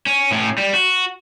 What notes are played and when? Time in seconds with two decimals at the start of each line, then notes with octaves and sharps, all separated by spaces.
0.06 C#4
0.31 A2 C#4
0.58 G3
0.74 F#4